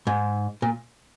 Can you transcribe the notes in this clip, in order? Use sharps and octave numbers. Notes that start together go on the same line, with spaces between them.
G#2
A#2